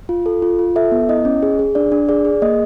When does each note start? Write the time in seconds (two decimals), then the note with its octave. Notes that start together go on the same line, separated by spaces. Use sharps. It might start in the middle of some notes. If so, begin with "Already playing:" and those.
0.09 F4
0.26 A4
0.42 F4
0.59 F4
0.76 A4 E5
0.92 B3
1.09 E4 D#5
1.25 C#4
1.43 G#4
1.59 G#4
1.75 D4 D5
1.92 D4
2.09 G#4 D5
2.25 G#4
2.42 A#3 D#5